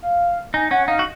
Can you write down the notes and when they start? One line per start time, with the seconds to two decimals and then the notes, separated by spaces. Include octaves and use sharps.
0.02 F5
0.54 D#4 G#5
0.71 C#4 F#5
0.88 D#4 F5
0.99 F#4